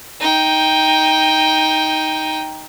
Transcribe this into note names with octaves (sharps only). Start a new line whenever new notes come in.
D#4 G5